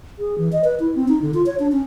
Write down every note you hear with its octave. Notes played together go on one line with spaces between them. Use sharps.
G#4
E3
D#5
B4
E4
C4
D#4
D3
F4
C#5
D4
C#4